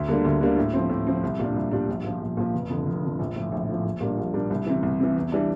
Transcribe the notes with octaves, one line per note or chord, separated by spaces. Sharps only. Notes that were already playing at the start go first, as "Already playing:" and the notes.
Already playing: D2
D3 G3 A#3 D4
D2
D3 G3 A#3 D4
A2
F3 C4
A2
F3 C4
C2
A#2 G3 D4
C2
A#2 G3 D4
A#1
A#2 F3
A#1
A#2 F3
F1
F2 D3
F1
F2 D3
A#1
A2 F3
A#1
A2 F3
A#1
A#2 G3 A#3 D4
A#1
A#2 G3 A#3 D4
C2
C3 E3
C2
C3 E3
E2
E3 G3 D4